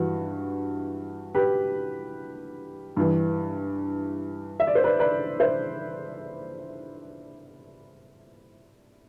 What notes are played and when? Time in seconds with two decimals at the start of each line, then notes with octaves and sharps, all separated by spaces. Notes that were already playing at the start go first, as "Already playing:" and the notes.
Already playing: G2 E3 F#4
1.35 G4 B4
2.97 G2 E3
4.60 E5
4.67 D5
4.75 C5
4.84 B4 D5
4.99 B4 D5
5.40 C5 E5